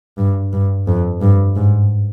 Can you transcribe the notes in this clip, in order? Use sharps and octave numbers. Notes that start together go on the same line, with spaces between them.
G2
G2
F2
G2
G#2